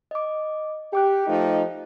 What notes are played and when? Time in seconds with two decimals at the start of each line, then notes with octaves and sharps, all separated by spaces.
0.11 D#5 D6
0.93 G4 G5 D6 F#6
1.27 F3 A3 D#4